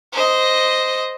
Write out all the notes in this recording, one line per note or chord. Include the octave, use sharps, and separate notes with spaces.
C5 D#5